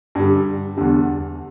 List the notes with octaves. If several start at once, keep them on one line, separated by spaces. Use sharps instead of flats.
G2 D3 G3
E2 D3 G3